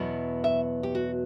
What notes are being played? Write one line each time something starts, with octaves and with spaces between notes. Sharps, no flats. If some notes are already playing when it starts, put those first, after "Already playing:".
Already playing: E2 B2 F#3 B3 E4
E5
G4
F#4